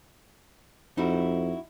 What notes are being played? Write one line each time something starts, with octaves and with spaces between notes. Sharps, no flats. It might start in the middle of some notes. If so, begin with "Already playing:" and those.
F2 D#4 E4 F#4